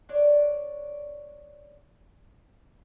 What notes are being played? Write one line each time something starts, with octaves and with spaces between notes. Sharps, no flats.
D4 C#5 D5